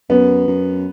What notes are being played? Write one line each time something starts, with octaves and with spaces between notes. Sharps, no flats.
F#2 B3
F#2